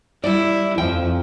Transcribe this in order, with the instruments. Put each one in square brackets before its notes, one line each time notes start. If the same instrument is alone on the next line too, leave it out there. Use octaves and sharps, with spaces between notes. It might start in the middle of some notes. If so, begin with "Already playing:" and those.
[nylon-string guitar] G3 D5 [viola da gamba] E4
[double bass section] F2 [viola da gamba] F3 [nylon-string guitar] G5